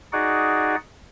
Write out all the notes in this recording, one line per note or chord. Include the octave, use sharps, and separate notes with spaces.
D#4 F#4 G#4 D5 F#5